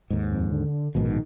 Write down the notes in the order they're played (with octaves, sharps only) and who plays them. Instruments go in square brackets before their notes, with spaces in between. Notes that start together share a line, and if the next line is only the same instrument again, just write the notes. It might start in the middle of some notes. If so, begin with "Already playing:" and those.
[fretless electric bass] D#2 G#2
[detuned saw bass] F2
D3
[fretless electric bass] A#1 G#2 B2 [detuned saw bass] D#3